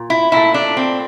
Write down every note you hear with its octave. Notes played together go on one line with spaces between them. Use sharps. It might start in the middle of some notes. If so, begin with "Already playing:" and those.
Already playing: A#2
E4
A#2 A3 E4
D4
C4